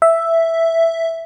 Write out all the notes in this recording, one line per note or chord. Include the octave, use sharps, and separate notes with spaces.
E5